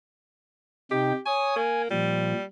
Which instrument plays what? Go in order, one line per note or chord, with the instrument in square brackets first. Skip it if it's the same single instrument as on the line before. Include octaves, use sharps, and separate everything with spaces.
[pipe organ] C3 D#4 G5 [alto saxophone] G4
[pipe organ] C#5 D#6 [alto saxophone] G#5
[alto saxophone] A#3 [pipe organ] G#5
[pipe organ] A#2 F3 [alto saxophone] G3